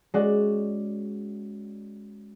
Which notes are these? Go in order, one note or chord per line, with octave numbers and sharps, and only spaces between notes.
G#3 C#4 F#4 D5 F#6